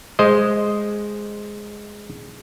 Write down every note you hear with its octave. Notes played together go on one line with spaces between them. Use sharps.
G#3 C5 D#5